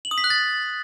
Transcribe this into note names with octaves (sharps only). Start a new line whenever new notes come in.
F#7
D#6
B6
F#6
A6